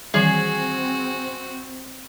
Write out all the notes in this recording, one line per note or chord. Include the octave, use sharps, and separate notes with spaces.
D#3 E3 G3 C4 F#4 G#4